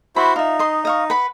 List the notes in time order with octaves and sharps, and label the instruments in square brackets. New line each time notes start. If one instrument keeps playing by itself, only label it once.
[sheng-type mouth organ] E4 F#4 C5 [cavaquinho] B5
[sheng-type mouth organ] D#4 [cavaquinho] F4 E5
[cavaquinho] D#5 C6
D#5 F5 C#6
B4 F#5 B5